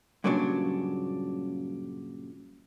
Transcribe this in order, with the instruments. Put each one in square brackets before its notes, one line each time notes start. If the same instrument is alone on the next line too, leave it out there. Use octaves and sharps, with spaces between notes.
[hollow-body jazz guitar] G2 A#2 C#3 F#3 D4